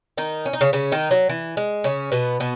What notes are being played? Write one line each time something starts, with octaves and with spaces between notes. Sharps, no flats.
D#3 D#4
C#4
D#4
C#3 C#4
C#3 C#4
D#3 D#4
F#3
E3
G#3
C#3 C#4
B2 B3
B2 B3